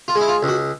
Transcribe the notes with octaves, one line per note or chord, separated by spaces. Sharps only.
F4
G#3
E4
F4
C#2
F#4